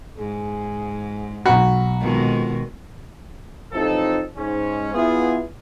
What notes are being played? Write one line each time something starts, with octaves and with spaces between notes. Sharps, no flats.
G#2 G#4
B1 F#4 A#5 B5
F2 B2 D#3 G#3
A1 F3 C4 D#4 A4
G#2 C#4
B3 E4 F4 G#4